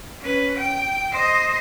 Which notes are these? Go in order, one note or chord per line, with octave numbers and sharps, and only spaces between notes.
C#4 B4
G5
C5 D#5